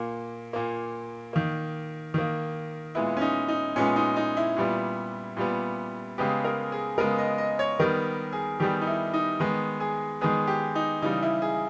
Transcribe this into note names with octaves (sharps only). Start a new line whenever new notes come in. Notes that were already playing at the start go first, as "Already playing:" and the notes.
Already playing: A#2 A#3
A#2 A#3
D#3 A#3
D#3 A#3
A#2 G#3 B3 E4
C#4
D#4
D#4
A#2 G#3 B3 C#4
D#4
D#4
E4
A#2 G3 B3
A#2 G3 B3
C#3 G#3 B3 G4
A#4
G#4
C#3 G#3 B3 A#4
D#5
D#5
C#5
D#3 G3 B3 A#4
G#4
D#3 G3 B3 G4
D#4
E4
D#4
D#3 G#3 B3
G#4
D#3 G#3 B3 G#4
G4
D#4
C#3 E3 G3 D#4
E4
G#4